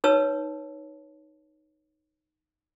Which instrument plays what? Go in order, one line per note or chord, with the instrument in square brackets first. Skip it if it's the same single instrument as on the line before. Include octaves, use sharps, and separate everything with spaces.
[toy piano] D#4 B4 C#5 A5 E6